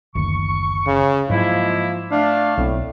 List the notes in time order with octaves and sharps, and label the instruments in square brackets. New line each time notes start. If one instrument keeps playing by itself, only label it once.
[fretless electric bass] F#1 D2 D#3 [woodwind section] C#6
[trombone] C#3
[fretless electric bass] G#2 F#3 [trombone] F3 [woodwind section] G#3 A#3 E4
[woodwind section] A3 F5 [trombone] D4
[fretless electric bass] B1 C4 [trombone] A2